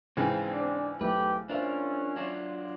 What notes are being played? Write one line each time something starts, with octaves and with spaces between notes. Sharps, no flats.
G#2 C#3 E3 C4 G5
D4
B1 A3 G4 B4 E5
C#4 D4 F4 A#4 C5 E5 F5
F#3 D4 F4